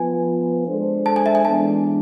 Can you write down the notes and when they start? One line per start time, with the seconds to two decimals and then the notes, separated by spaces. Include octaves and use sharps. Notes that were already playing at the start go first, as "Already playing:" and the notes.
Already playing: F3 B3 F4 B4 G#5
0.67 G#3 D4 A4 C5
1.06 A5
1.16 G#5
1.26 E5
1.35 G#5
1.45 E3 G#3 B3 D4 A5